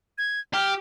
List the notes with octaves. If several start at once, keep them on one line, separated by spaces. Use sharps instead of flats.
G#6
G4 F6